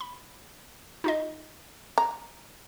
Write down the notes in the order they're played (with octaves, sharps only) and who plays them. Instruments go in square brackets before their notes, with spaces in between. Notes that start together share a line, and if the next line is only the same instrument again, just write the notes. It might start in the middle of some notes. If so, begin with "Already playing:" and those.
[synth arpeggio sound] B5
D#4 F4 D#5
[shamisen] A#5